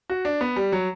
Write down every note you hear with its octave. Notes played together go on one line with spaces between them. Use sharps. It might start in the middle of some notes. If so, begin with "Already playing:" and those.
F#4
D4
B3
G3
F#3